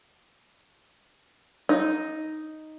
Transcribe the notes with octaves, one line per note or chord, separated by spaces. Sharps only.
D#4